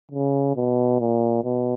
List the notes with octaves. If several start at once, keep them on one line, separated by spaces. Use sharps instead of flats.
C#3
B2
A#2
B2